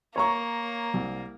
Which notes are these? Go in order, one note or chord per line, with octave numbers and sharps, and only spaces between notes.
A#3 C#5 A#5 C#6
C2